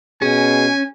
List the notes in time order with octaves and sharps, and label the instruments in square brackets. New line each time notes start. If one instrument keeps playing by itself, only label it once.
[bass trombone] B2 [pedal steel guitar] C#4 [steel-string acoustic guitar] G#4 [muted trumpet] G#5